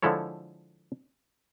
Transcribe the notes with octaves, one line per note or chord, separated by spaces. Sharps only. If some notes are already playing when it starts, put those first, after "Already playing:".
D3 F3 G#3 E4 A4 C#5